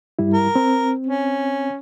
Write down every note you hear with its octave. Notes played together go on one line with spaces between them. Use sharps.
G2 G3 E4
A#4
C4
C#4